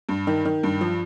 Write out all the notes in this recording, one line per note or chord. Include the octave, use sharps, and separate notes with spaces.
G2
D#3
D#3
G2
F3